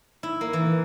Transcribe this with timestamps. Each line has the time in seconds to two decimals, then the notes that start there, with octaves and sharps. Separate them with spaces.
0.23 E4
0.41 A#3
0.53 E3